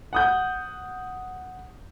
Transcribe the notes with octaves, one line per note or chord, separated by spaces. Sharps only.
F#5 D#6 G6